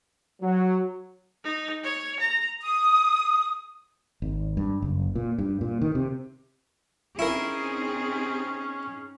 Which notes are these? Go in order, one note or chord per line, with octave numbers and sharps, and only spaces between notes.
F#3
D#4
C#5
A#5
D#6
G#1
G2
F#1
A#2
G2
A#2
D#3
C3
C4 C#4 D#4 E4 G#4 A#4